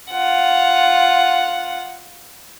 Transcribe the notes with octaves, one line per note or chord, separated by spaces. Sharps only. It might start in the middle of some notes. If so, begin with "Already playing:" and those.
F4 F#5